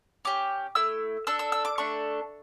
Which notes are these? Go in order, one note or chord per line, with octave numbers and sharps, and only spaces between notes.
C#4 G4 D6
A3 E4 E6
D4 A4 E6
E6
E6
D6
A3 D4 A4 C#6